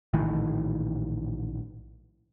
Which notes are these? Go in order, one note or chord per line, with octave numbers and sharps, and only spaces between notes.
A#1 A2 D#3 E3